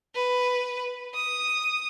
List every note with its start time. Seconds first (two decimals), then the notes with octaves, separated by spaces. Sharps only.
0.15 B4
1.14 D#6